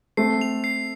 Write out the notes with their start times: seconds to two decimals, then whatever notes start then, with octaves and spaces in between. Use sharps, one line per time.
0.17 A3 C4 C7
0.41 F7
0.64 C7